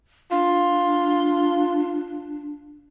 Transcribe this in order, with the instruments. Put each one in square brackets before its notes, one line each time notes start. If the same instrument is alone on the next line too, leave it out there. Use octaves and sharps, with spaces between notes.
[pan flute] D4 [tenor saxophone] F4